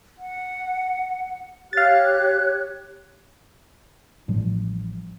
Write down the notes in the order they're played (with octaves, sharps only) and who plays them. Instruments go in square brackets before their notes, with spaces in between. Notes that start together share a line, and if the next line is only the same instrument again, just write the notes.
[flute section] F#5
[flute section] G4 C#5 F#6 [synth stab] F5 A6
[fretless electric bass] A1 A2 F3 G3